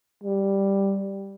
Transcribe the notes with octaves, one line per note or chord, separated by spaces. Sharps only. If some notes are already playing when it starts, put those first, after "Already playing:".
G3